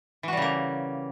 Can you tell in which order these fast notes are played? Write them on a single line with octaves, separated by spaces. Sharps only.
E3 F#4 G3 C#3 A#3